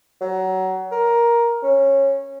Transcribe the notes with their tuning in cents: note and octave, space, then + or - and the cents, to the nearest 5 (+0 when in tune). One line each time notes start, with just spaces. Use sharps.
F#3 +25
A#4 +10
C#4 -15